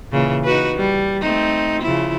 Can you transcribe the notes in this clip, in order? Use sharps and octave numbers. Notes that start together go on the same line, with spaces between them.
A#2 C#3 E3
D#4 F#4 B4
G3
A3 C4 D#4
C#3 F3 E4